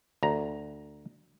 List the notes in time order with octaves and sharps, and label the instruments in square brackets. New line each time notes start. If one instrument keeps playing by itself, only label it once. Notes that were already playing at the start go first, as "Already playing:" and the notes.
[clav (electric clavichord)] D2 A#5